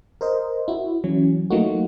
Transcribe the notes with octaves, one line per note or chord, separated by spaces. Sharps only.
A#4 C5 D#5
E4 F#4
E3 F#3 C#4
F#3 A3 A#3 D#4 F4 F#4